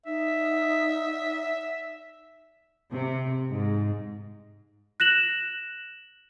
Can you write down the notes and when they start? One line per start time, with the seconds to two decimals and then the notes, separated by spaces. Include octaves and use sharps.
0.06 D#4 E5
2.91 C3
3.51 G#2
5.00 F#6 A#6 E7 F#7